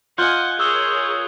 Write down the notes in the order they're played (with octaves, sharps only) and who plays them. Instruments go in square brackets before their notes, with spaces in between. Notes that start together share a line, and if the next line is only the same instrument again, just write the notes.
[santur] F4 D#5 [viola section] F#5 G#5 [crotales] F#6 G6 G7
[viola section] G#4 A#4 C#5 [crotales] C#6 D#6 G7 [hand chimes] E6